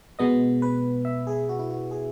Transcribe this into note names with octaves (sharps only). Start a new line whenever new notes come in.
B2 G#3 B3 D#5
B4
E5
G#4
F#4
E4
F#4
G#4